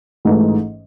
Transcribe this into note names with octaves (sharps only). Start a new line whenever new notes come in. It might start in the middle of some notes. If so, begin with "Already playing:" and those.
A1 G#2 E3 A3 D#4